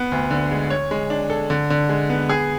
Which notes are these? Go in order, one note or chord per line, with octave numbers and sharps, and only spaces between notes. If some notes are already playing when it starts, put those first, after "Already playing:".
Already playing: B3
D2
D3
G#3
C#5
G#3
D4
A4
D3
D3
G#3
B3
G#4